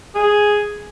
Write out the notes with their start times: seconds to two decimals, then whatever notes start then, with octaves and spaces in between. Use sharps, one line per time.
0.15 G#4